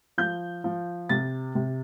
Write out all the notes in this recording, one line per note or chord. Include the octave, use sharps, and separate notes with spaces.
F3 G6
F3
C3 A6
C3